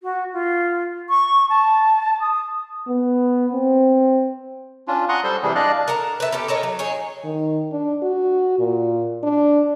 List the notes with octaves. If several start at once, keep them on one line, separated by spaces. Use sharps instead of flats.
F#4
F4
C#6
A5
D#6
B3
C4
C#4 D4 F4
F#5 A#5 C6 C#6 D#6 F#6
G3 A4 C5 C6
C3 E3 G3 G#4
D4 D5 D#5 F5 F#6
A#4 F#5 A5 A#5
B4 E5 A5
B3 C#4 G4 A4
A4 A#4 C#5 D#5
F#3
D#4 G#4 C#5
D#3
D4
F#4
A#2
D4